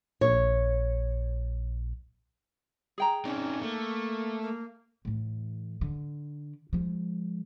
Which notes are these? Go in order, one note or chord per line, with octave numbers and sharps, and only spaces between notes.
A#1 C#5
G#4 G5 A#5
C4 C#4 D#4 D5
A3 A#3
A#3
A2 E3
D3
F3 G#3